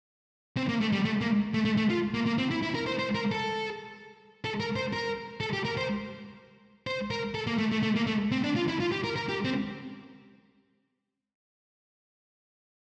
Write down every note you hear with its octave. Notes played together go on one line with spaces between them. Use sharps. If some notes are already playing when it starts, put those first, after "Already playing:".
C4
A#3
A3
G3
A3
A#3
A3
A3
A3
F4
A#3
A#3
C4
E4
E4
A#4
C5
C5
A#4
A4
A4
A#4
C5
A#4
A4
G4
A#4
C5
C5
A#4
A4
A#3
A3
A3
A3
A#3
A3
C4
D4
F4
E4
F4
G4
A#4
A#4
G4
C4